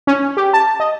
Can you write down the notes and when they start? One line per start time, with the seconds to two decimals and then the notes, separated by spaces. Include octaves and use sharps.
0.07 C#4
0.37 G4
0.53 A5
0.80 D#5